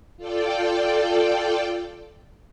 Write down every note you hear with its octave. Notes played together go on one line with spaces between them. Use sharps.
F4 A4 D5 G5